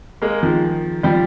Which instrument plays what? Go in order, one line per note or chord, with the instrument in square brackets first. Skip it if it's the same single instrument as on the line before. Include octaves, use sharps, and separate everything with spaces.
[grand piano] G#3 A#3
D#3 F3
F3 G3